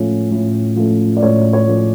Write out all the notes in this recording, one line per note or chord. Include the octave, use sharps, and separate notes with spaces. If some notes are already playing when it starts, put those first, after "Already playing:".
Already playing: A2 F3 A3 C#4
A2
F3 A3 C#4
D5
A2 C#5
C#5
F3 A3 C#4